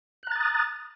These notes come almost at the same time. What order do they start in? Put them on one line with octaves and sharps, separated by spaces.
F#6 A#5 A6 D#6